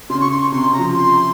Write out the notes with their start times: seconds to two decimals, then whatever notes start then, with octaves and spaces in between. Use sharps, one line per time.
0.10 C#3 C6
0.20 C#6
0.31 C6
0.41 C#6
0.52 C3 C6
0.66 C#3
0.73 A#5
0.79 F3
0.94 C6